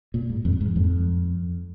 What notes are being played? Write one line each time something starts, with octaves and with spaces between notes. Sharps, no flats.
A#2
G#2
F2
G#2
F2